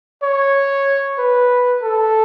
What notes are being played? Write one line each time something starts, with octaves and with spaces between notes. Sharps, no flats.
C#5
B4
A4